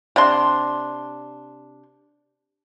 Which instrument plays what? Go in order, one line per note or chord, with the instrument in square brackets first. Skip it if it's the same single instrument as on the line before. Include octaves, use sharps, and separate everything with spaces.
[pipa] C3 D4 C6